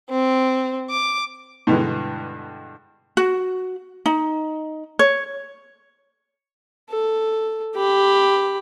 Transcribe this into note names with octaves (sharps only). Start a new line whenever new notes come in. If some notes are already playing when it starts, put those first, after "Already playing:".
C4
D6
G2 B2 D3 E3 G#3
F#4
D#4
C#5
A4
G4 B5